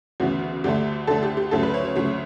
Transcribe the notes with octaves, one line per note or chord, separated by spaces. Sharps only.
D2 C#3 E3 B3 F#4
D2 D3 A3 G4
D2 D3 A3 A4
G4
G4
D2 C#3 F#3 A3 A4
B4
C#5
C#5
D2 C#3 F#3 A3 C#5